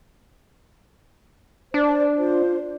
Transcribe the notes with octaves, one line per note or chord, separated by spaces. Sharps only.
D4 C5 D5
F4 C5